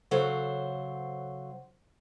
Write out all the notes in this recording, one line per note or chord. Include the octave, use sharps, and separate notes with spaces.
C#3 F#3 A4 C5 F#5